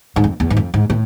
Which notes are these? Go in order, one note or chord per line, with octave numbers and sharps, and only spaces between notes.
G#2
F2
E2
G#2
F2
G#2
A2